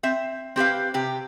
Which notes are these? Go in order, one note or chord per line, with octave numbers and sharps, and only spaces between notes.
C4 E5
C4 G4 B4 F5
C3 G4